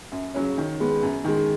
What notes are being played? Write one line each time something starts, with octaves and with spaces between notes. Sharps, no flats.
F#2
C#3 F#3 C#4
D#3
G#3 B3
F#2
D#3 G#3